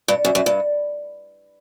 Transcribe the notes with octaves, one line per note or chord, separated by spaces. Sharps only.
G2
F#2
F#2
G2